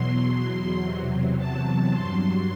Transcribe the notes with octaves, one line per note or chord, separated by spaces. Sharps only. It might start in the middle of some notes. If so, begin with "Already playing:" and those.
Already playing: E2 B2 F#3 C6
E2 C3 F#3
A5
G2 F#3 C6